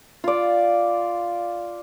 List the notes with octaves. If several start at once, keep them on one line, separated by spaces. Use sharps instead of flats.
F4 D5